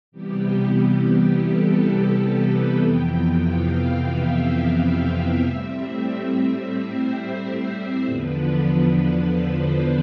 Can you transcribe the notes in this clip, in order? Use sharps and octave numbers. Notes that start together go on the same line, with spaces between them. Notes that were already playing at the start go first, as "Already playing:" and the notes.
C3 E3 G3 B3 G4
A4
G4
A4
B4
F2 C3 E3 B3 G5
G5
F5
E5
A2 G3 C4
C5
E2 D3 F3 B3 D4 B4
C5